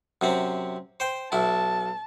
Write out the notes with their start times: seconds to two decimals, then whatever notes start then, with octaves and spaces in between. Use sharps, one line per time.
0.21 F#2 C3 C4
1.00 C5 G5 C6
1.32 B1 E4 A5